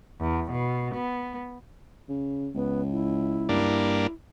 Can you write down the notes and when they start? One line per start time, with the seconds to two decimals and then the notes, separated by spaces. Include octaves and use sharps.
0.21 E2
0.52 B2
0.95 B3
2.09 C#3
2.55 C#2 B3
2.92 E4
3.49 G2 A#3 D4